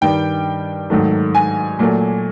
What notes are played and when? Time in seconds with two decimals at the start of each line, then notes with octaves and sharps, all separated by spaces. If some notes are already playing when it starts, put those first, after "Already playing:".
0.01 G2 D#3 G3 G5
0.90 G#2 D#3 F#3 A3
1.35 G#5
1.79 A#2 F#3 A3